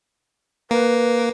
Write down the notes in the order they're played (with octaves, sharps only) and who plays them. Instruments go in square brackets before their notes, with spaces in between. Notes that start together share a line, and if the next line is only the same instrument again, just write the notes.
[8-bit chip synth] A#3 [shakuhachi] B4